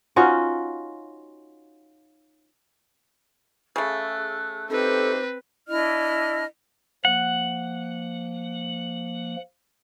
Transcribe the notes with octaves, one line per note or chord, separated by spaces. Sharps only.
C#4 D#4 F4 F#4
C#3 A3 G#4 E6 F#6
C4 D#4 G4 A4 B4 C5
D4 E4 D#5 F6
F3 A#3 F#5